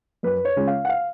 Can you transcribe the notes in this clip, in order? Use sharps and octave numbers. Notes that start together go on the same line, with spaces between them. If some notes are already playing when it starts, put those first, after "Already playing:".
F#2 B4
C#5
C#3 G#3 C#4 F4
F5
F#5
F5